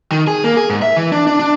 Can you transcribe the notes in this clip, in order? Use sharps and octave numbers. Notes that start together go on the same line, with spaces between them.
D#3
G#4
A#3
G#4
G#2
E5
E3
D4
D4
D4